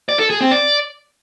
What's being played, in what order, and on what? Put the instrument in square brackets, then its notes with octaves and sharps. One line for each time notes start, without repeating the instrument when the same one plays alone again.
[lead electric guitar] D5
A4
G#4
C4
D5